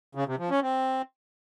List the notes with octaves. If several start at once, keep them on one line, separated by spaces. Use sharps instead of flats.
C#3
C3
F3
C#4
C4